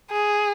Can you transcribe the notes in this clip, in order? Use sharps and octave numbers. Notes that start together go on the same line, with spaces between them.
G#4